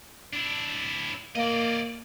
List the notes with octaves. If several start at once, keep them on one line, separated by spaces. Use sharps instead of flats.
D4 E4
A#3 D5 D#5